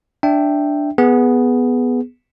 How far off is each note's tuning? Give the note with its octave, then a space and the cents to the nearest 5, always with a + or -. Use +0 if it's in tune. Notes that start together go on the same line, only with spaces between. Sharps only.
D4 +0 E5 +0 G5 +0
B3 +0 G#4 +0